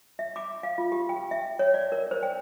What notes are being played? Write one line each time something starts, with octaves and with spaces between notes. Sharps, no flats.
E5
D6
F5
F4
G4
G5
E5
C#5
D5
A#4
C5
G5